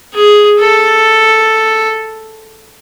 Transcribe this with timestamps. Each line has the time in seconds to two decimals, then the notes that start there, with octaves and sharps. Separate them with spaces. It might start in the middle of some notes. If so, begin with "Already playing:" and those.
0.14 G#4
0.60 A4